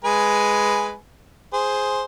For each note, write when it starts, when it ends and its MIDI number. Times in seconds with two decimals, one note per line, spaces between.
0.04 0.95 56
0.04 0.95 71
0.04 0.95 80
1.53 2.04 68
1.53 2.04 72